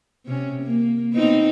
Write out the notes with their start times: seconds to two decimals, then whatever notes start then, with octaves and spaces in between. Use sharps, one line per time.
0.26 C3 C#4
0.62 A#3
1.12 B3 C4 D#4